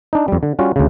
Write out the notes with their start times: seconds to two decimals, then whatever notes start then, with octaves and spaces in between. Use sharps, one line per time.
0.13 D4 D#4
0.28 F2 G3
0.43 D3
0.59 G3 C#4 F4 F#4
0.76 D2 C#3